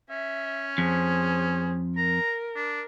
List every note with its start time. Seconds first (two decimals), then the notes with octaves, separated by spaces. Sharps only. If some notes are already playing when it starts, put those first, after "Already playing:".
0.10 C#4 E5
0.78 F2 G#4 C5
1.97 A#4 A#5
2.56 D4